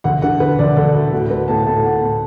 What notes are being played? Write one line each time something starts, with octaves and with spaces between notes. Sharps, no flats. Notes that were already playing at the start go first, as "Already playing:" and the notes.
D2 F#5
D3 F#5
D3 B4
D2 D5
D2 A4
D2
A2 F#4
A3 B4
A2 A5
A2 A5
A2 F#5
A2 A5